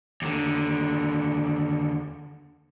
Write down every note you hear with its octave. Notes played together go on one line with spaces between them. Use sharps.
D#2 D3